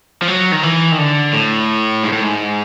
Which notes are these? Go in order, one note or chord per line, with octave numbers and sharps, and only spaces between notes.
F3
F#3
D#3
E3
D#3
D3
A2
G#2
A2
G#2